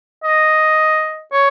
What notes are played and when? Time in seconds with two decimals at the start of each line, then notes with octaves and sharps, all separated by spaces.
0.24 D#5
1.33 C#5